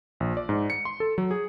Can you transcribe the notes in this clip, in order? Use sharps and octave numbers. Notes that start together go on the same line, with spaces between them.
A#1
D5
G#2
C#7
C6
A4
F#3
G#4